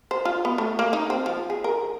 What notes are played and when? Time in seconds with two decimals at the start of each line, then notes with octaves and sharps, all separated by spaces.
0.11 C5
0.25 F4
0.45 B3
0.58 A3
0.79 A#3
0.93 D#4
1.10 C4
1.26 F3
1.50 G#4
1.64 A#4